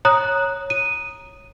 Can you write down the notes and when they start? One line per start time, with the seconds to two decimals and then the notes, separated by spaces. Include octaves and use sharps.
0.05 C#5 A#5 D#6 F#6
0.70 D#7